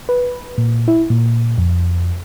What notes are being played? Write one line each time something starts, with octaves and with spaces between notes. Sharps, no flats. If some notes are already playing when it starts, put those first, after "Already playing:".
B4
A#2
E4
A#2
F2